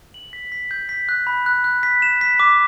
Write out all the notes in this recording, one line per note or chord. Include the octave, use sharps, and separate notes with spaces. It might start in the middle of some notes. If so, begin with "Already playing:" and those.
F#7
B6
B6
G6
B6
F#6
B5
F#6
F#6
B6
E7
B6
D6